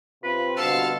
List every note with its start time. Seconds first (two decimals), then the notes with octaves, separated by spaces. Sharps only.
0.24 C3 C4 F4 B4
0.57 G2 B2 D3 A4 F5 A5